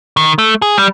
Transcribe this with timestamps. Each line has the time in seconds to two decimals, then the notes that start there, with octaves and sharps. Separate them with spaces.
0.17 D#3
0.38 A3
0.62 G#4
0.78 G3